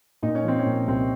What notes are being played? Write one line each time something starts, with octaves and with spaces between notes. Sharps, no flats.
A#2 D#4
C#4
F3 C4
C#4
A#2
C2 C4